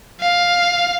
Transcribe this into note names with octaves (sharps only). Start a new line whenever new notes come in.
F5